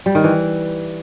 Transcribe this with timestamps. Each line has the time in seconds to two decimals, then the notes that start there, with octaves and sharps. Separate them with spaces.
0.06 G3
0.15 D#3
0.24 E3